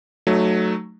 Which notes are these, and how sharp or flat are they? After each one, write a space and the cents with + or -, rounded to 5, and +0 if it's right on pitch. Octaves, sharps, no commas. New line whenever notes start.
F#3 +0 A3 +0 D#4 -35